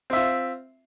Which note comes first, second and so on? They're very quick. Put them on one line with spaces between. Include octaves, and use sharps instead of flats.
C4 E5 F4